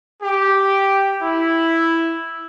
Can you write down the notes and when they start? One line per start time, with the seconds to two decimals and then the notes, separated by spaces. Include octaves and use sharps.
0.21 G4
1.22 E4